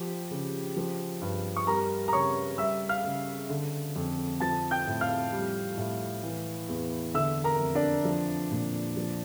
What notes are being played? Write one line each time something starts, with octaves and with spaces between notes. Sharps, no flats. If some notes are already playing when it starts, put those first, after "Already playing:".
Already playing: F3 G4
C#3
F3
G2
C#6
G3 A#4 A#5
A#5
C#3 C#5 C#6
G3 E5 E6
F5 F6
C#3
D3
F2
F3 A5 A6
G5 G6
A2
F5 F6
G3
A2
E3
E2
D3 E5 E6
A#4 A#5
F2
D4 D5
F3
A#2
F3